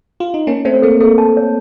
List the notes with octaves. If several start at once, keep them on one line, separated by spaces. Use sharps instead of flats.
F4
D#4
A#3 C#4 A5
A3 C4 C#5
A#3 A4
A#3 A4
A5
C#5